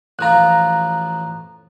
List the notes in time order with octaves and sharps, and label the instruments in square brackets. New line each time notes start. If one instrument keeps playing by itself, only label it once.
[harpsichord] A1 F3 F4 [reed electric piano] A#5 F#6